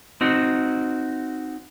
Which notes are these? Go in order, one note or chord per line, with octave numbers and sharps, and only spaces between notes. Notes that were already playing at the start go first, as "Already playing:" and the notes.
C4 D#4 F#4